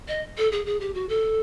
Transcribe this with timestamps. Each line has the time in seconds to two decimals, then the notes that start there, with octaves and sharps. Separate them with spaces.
0.08 D#5
0.37 A4
0.52 G#4
0.66 G#4
0.80 G4
0.94 F#4
1.09 A4